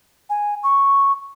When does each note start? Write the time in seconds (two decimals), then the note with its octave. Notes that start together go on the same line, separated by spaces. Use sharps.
0.30 G#5
0.63 C#6